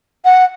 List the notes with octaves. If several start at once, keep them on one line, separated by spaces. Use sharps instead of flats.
F#5